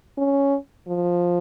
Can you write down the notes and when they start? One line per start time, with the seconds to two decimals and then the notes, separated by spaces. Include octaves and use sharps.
0.18 C#4
0.89 F3